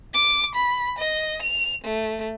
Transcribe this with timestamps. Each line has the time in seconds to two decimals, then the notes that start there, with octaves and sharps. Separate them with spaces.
0.14 D6
0.55 B5
0.99 D#5
1.42 F7
1.84 A3